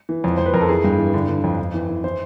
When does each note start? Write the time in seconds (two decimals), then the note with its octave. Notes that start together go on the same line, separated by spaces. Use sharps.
0.09 E3
0.24 F2
0.38 F2 C5
0.46 B4
0.54 F2 A#4
0.61 A4
0.69 E3 G#4
0.84 G2
0.99 E3
1.14 D3
1.28 D3
1.44 F2
1.59 F2
1.74 E3
1.89 E3
2.04 E3 C5